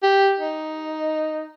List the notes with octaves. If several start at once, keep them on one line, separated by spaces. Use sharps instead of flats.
G4
D#4